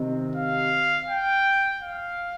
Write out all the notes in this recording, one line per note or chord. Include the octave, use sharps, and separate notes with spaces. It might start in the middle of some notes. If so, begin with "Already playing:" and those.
Already playing: C3 D#3 C4
F5
G5
F5